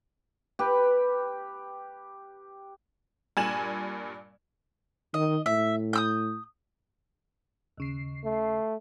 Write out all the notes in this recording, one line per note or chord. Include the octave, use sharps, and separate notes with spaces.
G4 B4
G2 A#2 G#5 E7 F#7
D#3 D#5
A2 E5
D#6 E6 G6
D#2 C#3 C7
A3